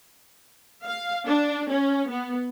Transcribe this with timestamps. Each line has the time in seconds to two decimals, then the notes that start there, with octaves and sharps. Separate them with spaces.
0.86 F5
1.26 D4
1.69 C#4
2.09 B3